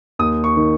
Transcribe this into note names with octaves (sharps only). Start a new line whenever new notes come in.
D#2 D#6
C#6
D#3